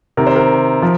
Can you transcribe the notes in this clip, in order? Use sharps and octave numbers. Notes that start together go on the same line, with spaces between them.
C3 D#3 A#4
C5
A#4
F3